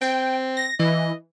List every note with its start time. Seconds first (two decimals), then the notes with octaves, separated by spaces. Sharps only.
0.01 C4 G5
0.57 A#6
0.80 E3 D#5